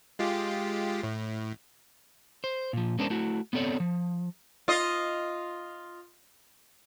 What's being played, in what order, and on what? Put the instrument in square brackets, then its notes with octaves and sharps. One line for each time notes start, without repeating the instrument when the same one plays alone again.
[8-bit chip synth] G#3 F4 G4
A2
[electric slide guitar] C5
A#2 F3
G#3 B3 C#4 D4 A#4 C5
A3 E4 F#4
B3 C4 A4 C#5 D5
F3
[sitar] F4 D#5